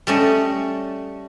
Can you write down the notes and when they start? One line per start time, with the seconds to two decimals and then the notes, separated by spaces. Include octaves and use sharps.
0.07 G3 A3 C#4 D#5